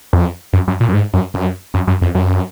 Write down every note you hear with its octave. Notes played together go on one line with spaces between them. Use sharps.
F2
F#2
F#2
A#2
F#2
G#2
F#2
F#2
F#2
F#2
F2
F#2